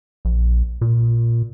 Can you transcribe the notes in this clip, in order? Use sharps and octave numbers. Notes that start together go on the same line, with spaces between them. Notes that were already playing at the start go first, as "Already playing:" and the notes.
A#1
A#2